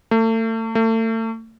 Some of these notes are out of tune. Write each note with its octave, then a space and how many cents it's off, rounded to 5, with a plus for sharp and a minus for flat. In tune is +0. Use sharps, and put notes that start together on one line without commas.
A3 +35
A3 +35